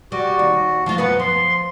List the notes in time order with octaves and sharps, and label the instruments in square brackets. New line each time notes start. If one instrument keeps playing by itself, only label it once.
[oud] G3 [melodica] F#4
[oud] D#2
F3 A3 F4
[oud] F#2 B3 B4 [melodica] F#5
[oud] F3 [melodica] C6